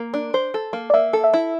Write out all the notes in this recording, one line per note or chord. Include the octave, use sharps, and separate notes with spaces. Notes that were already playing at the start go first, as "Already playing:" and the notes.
Already playing: A#3
D4
C5
A4
A#3
D5
A#3 E5
A4
E5
E4